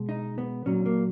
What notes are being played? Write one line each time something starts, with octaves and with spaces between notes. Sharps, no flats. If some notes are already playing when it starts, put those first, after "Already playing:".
Already playing: B2 G#3
D#4
B3
A#2 F#3 C#4
A#3